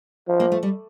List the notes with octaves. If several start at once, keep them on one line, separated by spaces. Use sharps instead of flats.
F3
A#3
A3
G3